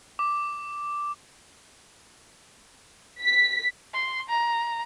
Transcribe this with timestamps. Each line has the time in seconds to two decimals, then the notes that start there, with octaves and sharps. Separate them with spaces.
0.19 D6
3.21 B6
3.93 C6
4.29 A#5